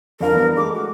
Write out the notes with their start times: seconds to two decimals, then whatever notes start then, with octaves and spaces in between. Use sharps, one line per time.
0.21 F2 D3 A#4 F5
0.33 E3 G3 B3
0.57 G#3 A3 D6
0.73 F#4